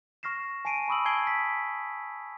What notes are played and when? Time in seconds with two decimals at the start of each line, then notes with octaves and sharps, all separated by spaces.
0.23 C#6 F6 A#6 C7 E7
0.65 G#5 A5 C7 D7 D#7
0.88 G#5 B5 C#6 D#6 E6 F#7
1.05 G#5 A5 G#6 C7 D7 G7
1.27 B6